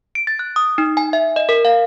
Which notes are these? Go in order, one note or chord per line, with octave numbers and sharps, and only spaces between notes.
D7
A6
F#6
D#6
D#4
G#5
E5
D#5
A#4
F5